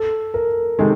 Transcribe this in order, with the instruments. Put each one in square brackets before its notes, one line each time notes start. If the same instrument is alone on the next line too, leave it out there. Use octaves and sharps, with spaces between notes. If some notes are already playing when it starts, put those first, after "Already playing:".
Already playing: [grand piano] A4
A#4
[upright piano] C3 D#3 G#3 [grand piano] A4